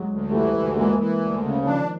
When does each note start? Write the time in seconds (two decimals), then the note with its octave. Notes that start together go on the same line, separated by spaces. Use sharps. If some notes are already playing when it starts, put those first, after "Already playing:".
Already playing: F#3 G#3
0.09 D2
0.31 E3 G3 A3
0.54 D2
0.75 E3 G#3 A#3
0.98 E3
1.20 D2
1.43 C#3
1.65 D#3 F3 D4